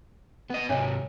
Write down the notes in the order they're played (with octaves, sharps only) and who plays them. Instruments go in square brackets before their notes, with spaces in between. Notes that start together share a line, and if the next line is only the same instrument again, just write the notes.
[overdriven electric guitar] B3 D#5
[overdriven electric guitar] G#2 C3 [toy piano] D4 C#5 E5